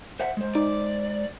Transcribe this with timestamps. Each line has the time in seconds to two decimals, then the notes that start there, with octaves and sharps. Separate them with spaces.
0.20 C5 E5 F#5
0.37 G#3 C5
0.55 D#4 D5